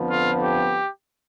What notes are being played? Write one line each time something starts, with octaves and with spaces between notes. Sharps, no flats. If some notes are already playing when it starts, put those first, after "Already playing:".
Already playing: F2 D3 F3 B3
F4
G4